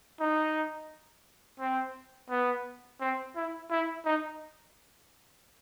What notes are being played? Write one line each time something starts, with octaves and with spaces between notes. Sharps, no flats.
D#4
C4
B3
C4
E4
E4
D#4